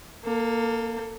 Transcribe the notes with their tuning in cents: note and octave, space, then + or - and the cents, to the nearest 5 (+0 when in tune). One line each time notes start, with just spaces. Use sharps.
A#3 +0 A4 +30